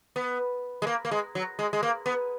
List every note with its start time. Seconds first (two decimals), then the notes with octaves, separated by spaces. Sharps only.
0.16 B3
0.82 G#3
0.87 A#3
1.05 A#3
1.11 G#3
1.35 F#3
1.59 G#3
1.73 G#3
1.83 A#3
2.06 B3